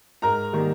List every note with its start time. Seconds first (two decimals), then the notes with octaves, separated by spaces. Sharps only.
0.22 G#2 A#4 A#5
0.53 D#3 G3 A#3